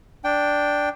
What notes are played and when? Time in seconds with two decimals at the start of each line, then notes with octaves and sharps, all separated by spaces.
0.24 D4 G5